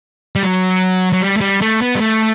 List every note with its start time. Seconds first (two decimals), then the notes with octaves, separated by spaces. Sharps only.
0.36 G3
0.43 F#3
1.13 F#3
1.22 G3
1.37 A3
1.41 G3
1.61 A3
1.81 B3
1.95 G3
2.00 A3